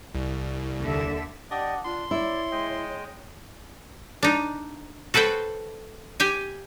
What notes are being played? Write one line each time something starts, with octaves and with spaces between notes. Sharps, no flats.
C2
D#2 D3 E5
D4 G4 D5 D#5 F#5
D4 F4 C6
E4 C#5 D5
G#3 D#5 G5
D4 D#4
F#4 A4 B4 C5 G5
G4 G5 G#5